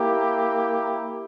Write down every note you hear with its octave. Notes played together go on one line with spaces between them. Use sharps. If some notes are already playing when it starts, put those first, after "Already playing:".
Already playing: A#3 E4 G4